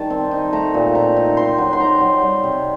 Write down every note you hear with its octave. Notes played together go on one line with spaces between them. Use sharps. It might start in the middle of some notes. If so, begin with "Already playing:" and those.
Already playing: D#3 G3 A5
C4
D#4
A3 A#5
A#2
C4 A#5
D#4
C4 C6
F#3
C6
D#4 A#5
F#3
G3
C3